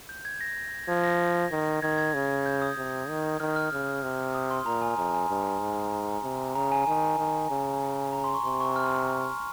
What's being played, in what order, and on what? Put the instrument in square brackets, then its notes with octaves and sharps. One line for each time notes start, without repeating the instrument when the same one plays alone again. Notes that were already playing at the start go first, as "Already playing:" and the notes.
[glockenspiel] G6
G#6
A#6
[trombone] F3 [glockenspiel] G#6
[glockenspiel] A#6
[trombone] D#3
[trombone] D#3 [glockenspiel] G#6
[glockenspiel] G#6
[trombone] C#3
[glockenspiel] G6
D#6
[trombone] C3
D#3
[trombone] D#3 [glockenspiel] F6
[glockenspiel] F6
[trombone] C#3
C3
[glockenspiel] D#6
C6
[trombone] A#2 [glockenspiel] A#5
[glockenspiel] G#5
[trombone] F2 [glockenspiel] A#5
[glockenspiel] G#5
[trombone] G2
G#2
[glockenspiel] A#5
[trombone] C3
[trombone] C#3 [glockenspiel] A#5
[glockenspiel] G#5
[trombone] D#3 [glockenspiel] G#5
[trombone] D#3
C#3
[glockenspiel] A#5
C6
C#6
[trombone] C3 [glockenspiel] C6
[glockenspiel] C#6
F6